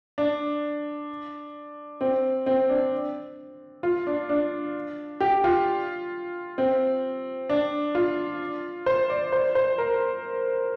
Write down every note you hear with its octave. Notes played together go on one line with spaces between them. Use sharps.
D4
C4
C4
D4
F4
D4
D4
G4
F4
C4
D4
F4
C5
D5
C5
C5
A#4